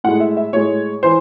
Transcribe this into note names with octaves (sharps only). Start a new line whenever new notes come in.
A2 G#3 F#5
E5
E5
A2 G#3 C#5
E3 C5